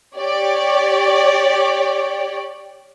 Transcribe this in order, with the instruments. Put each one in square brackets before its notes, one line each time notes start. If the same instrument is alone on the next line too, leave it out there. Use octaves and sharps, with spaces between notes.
[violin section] G4 C#5 D5